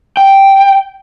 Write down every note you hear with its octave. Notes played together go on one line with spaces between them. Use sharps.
G5